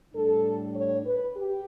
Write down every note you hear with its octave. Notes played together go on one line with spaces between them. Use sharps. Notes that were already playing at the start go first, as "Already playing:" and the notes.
A2 G3 D4 A4
C#5
B4
G4